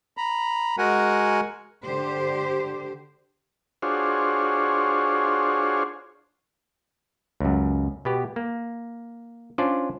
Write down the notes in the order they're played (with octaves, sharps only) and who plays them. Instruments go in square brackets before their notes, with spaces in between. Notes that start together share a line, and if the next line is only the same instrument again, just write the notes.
[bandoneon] A#5 B5
G#3 F#4 A#4 F#5 G#5
[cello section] D3 G4 C5
[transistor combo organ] D4 F4 F#4 G#4 C5 C#5
[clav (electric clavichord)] C#2 F#2
B2 B3 G4
A#3
C#4 D4 F4 C5 D5